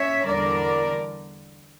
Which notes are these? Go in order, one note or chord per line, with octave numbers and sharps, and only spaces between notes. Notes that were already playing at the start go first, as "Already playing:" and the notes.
Already playing: C#4 C#5 E5
E2 D3 G3 A#4 D5